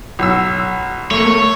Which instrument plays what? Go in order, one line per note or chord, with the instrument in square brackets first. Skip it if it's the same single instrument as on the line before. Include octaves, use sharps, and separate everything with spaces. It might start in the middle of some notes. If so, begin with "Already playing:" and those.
[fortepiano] B1 E6
[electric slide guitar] A3 A#3 [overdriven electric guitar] C#5